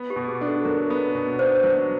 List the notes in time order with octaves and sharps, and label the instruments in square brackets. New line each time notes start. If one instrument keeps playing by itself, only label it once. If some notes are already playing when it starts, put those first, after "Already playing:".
Already playing: [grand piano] B3
[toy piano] G4
[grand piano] B2
[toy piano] G#4
[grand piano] D4
[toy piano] A4
[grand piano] F#3 [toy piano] A#4
[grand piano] B3
B2
[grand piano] D4 [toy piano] C5
[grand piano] F#3